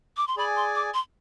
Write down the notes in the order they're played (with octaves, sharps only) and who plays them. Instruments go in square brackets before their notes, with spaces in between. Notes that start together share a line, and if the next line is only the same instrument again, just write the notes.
[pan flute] D6
C6
[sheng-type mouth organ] G#4 D5 G#5 [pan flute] B5
[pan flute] C6
D6
C6